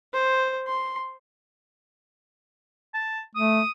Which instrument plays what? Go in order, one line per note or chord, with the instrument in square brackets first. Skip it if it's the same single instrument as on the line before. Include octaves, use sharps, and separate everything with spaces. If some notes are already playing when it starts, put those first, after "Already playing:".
[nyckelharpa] C5
C6
[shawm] A5
[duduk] A3 [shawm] D#6